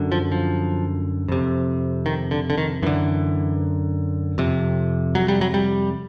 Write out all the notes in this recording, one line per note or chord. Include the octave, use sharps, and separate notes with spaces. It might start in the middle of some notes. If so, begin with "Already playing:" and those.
Already playing: F#2 D3
F3
F3
F2 C3
D#3
D3
D3
D#3
F#2 D3 E3
F2 C3
F#3
G3
F#3
G3